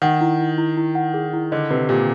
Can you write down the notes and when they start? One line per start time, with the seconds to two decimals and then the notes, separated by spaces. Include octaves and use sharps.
0.02 D#3 F#5
0.21 E4
0.40 E4
0.58 E4
0.77 E4
0.95 F#5
1.14 G#4
1.33 E4
1.52 D3 D#5
1.70 C3 B4
1.89 A#2 G4